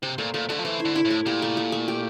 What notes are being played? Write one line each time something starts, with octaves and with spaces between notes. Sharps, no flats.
C3 C5
A#2 A3
A#2 A3
D3 A3
F3
E3 C5
E4
D3
E4
A2
A3
A#2 G4
A3
A3
A3
G4